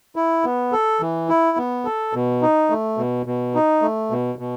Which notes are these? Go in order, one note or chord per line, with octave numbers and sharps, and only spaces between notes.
E4
B3
A4
E3
E4
B3
A4
B2
D#4
A3
B2
B2
D#4
A3
B2
B2